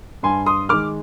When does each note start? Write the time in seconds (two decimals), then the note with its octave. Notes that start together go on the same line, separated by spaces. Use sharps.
0.23 G2 G#5 C6
0.46 C6 D#6
0.69 D#3 G#3 D6 F6